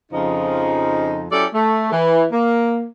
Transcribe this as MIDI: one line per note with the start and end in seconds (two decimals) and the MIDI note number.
0.12 1.25 41
0.12 1.25 49
0.12 1.25 53
0.12 1.25 63
1.32 1.45 54
1.32 1.45 61
1.32 1.45 64
1.32 1.45 67
1.32 1.45 69
1.32 1.45 74
1.53 1.89 57
1.91 2.25 52
2.32 2.85 58